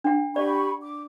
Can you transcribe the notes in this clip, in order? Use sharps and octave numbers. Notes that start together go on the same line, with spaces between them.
D4 F#5
G4 D5 B5 C#6
D6